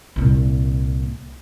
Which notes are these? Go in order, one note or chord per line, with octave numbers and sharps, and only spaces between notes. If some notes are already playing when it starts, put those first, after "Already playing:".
C2 A#2